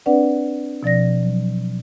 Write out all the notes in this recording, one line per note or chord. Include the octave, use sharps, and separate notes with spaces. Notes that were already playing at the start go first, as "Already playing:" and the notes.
C4 D4 B4 D5 F#5
B2 F3 D5 A#6
F#3